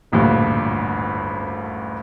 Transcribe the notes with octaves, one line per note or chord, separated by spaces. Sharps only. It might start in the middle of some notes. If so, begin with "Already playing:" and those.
D#1 A1 D2 G2 A#2